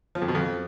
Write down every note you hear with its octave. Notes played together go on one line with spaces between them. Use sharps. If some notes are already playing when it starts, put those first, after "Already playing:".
F3
F2
B2
F2